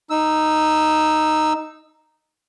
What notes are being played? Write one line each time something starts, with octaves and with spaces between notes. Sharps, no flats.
D#4 E6